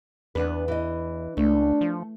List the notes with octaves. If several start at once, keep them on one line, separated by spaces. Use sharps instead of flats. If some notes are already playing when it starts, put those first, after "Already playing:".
E2 B3 D4 B4
E3 D#5
C#2 A3 D4
F3